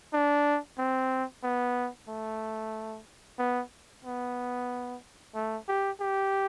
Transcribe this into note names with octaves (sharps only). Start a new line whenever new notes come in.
D4
C4
B3
A3
B3
B3
A3
G4
G4